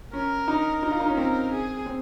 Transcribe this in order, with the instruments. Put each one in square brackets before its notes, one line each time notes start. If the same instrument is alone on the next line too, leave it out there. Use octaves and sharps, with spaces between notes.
[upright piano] C#4 [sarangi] A#4
[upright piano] D#4
D#4
F4
D#4
C#4
[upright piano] C4 [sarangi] A#4
[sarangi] G#4
[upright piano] C4